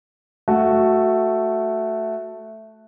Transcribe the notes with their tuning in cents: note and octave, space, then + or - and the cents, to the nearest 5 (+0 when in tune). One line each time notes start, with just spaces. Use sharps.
A3 +0 F#4 +0